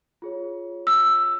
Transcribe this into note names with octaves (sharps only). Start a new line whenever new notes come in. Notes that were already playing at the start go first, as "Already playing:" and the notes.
F4 G#4 C#5
E6